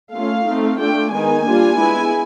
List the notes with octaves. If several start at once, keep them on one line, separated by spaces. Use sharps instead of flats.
A3 C#4 F4 F5
A3 C4 D#4
A3 D4 F4 G5
D#3 G#3 B3 D#4 G#5
G3 A#3 D4 F4
G#3 B3 E4